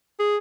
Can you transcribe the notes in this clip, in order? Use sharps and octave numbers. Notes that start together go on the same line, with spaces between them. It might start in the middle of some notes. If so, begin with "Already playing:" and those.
G#4